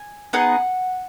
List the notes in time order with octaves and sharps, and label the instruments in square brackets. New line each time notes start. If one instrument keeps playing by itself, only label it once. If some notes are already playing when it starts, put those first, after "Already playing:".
Already playing: [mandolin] G#5
B3 D#4 G#4 F#5